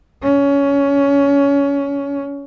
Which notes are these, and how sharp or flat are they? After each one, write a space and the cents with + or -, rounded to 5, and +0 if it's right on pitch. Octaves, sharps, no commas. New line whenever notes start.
C#4 +20